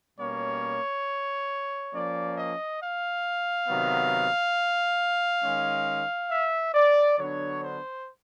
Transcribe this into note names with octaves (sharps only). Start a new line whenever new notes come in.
B2 G3 A#3 C#4 C#5
F3 A#3 C#4 D5
D#5
F5
C3 D#3 F#3 B3
D#3 G#3 C#4
E5
D5
D3 F#3 B3 D4 C#5
C5